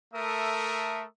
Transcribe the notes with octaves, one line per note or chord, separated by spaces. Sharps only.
A3 A4 A#4 E5 D#6